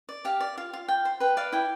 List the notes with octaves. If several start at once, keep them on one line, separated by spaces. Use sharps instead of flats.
D5
G4 F5
D5
F4 F5
F4
F4 G5
C5
B4 G5
D5 F5
E4 G5